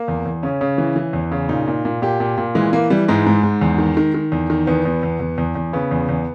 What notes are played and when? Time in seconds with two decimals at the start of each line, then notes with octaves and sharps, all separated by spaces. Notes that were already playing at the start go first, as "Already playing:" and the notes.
Already playing: A#3
0.08 E2
0.26 E2
0.43 C#3 C#4
0.61 C#3
0.78 E3
0.96 E3
1.13 E2
1.32 C#3
1.49 A#2 D#4
1.67 A#2
1.85 A#2
2.02 A#2 G4
2.20 A#2
2.38 A#2
2.55 E3 G#3
2.73 E3 A#3
2.90 E3 G3
3.08 G#2 G#3
3.26 G#2
3.43 G#2
3.61 E2
3.78 D#3
3.97 D#3
4.14 D#3
4.32 E2
4.50 D#3
4.67 E2 B3
4.85 E2
5.03 E2
5.20 E2
5.38 E2
5.55 E2
5.73 C#3 B3
5.91 E2
6.09 E2